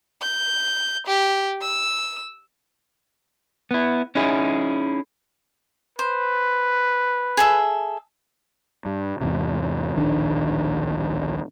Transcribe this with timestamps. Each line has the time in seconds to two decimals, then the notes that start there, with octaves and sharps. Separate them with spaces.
0.22 G6
1.07 G4
1.62 E6
3.71 B3 E4
4.15 C#4 D#4 E4 G#4
5.99 B4 C5
7.37 G#4 A4 E5
8.85 G2
9.21 E2 G#2 C3
9.96 D1 A#1 D#3 D4